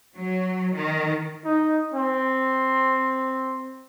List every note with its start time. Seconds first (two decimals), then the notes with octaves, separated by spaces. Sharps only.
0.17 F#3
0.76 D#3
1.45 D#4
1.94 C4